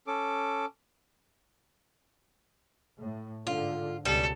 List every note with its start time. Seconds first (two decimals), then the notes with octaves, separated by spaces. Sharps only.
0.07 C#4 A4 D6
2.98 A2
3.47 G#2 D3 F4
4.05 C#2 B2 G3 A4